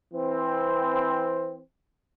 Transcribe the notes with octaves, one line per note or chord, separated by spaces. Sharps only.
E3 C4